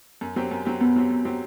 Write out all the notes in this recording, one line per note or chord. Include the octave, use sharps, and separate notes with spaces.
F#2
F#3 C4 G4
F#2
F#3 C4 G4
F#2 B3
F#3 C4 G4
F#2
F#3 C4 G4